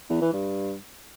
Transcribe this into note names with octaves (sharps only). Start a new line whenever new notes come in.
E2
E3
G2